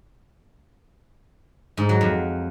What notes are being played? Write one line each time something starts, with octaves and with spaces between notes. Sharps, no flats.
G#2
F#3
F2